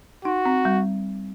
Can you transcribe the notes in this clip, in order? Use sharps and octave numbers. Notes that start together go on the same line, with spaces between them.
D#4 F#4
C4
G3